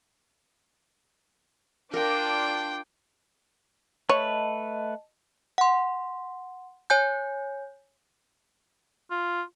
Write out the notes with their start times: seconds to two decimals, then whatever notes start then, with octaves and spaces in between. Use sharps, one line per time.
1.94 D4 F4 A#4 G5 D6
4.09 A3 B4 C#5 D#5 A5
5.58 F#5 C6
6.90 C#5 G#5 G6
9.11 F4